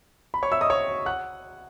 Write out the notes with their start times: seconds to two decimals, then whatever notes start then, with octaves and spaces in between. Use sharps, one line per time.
0.34 B5
0.43 C#5 C#6
0.52 E5 E6
0.61 D#5 D#6
0.70 C#5 C#6
1.06 F#5 F#6